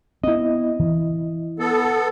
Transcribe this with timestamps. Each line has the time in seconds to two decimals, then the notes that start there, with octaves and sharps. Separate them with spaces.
0.24 B3 C4 E4 D#5
0.79 E3
1.59 B3 A4